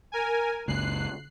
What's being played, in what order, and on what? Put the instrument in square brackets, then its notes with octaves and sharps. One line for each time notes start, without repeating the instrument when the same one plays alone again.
[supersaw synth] A#4 G#5
[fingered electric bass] F#1 C#2 [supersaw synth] F#6 C7